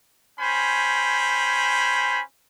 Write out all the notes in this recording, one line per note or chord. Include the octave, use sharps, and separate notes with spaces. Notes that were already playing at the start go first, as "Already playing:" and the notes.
C#4 C5 G5 G#5 B5